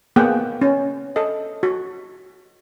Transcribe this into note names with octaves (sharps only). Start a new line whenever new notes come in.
A#3 B3 G#4 F#5 G5
C#4
A4 D#5
F#4